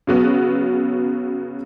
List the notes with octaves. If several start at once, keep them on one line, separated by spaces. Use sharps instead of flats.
C#3 F#3 B3 F#4